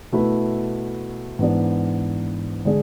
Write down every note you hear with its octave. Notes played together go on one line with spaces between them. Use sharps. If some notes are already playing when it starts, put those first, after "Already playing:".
B2 A3 E4 B4
G#2 E3 B3 D4
D3 G#3 D4 G#4